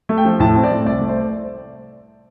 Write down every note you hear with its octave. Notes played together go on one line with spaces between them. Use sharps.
A3
G5
F3
A2 A5
C4
D5
A3
C2 D5
A3
C5